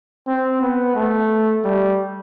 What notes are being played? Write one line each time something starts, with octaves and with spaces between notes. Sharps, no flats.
C4
B3
A3
G3